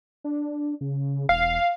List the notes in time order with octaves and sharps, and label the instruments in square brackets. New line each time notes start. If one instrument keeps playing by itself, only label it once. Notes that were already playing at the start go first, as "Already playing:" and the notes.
[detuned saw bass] D4
C#3
[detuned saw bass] E1 [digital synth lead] F5